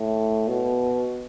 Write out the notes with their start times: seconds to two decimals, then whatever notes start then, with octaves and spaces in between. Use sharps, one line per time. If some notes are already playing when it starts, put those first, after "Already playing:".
Already playing: A2
0.48 B2